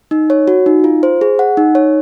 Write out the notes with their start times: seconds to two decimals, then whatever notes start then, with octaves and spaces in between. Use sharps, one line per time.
0.11 D#4
0.30 C#5
0.48 F#4
0.66 D#4
0.84 F4
1.03 C5
1.21 G#4
1.39 F#5
1.57 D#4
1.75 C#5